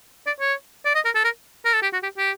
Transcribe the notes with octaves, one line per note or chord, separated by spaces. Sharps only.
D5
C#5
D5
D#5
A#4
A4
A#4
A#4
A4
G4
F#4
G4
G4